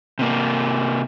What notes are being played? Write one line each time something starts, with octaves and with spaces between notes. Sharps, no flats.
C3 A#3